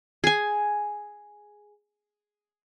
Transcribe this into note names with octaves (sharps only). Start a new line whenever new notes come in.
G#4 G#5